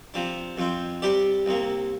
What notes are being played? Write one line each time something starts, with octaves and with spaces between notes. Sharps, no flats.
C3 F3 D4
F2 F3 C4
C3 G3 D4 G4 D5
C2 C3 A#3